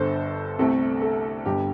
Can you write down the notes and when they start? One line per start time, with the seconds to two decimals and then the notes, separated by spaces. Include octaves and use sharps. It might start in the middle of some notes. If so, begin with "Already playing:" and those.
Already playing: G1 G2 D3 A4 C5
0.59 C2 C3 A3 C4 A4
1.02 A4
1.46 G1 G2 G3 G4